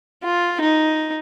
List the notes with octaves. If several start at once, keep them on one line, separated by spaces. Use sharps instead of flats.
F4
D#4